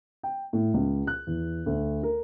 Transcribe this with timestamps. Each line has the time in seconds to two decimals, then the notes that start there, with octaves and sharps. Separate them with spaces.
0.23 G5
0.53 A2
0.74 C#2
1.07 F#6
1.27 E2
1.66 D2
2.03 A#4